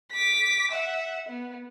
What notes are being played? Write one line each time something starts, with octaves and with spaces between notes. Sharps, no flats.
D6 B6
E5 F#5
B3